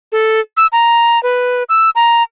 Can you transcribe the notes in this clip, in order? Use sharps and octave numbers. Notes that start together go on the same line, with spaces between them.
A4
E6
A#5
B4
E6
A#5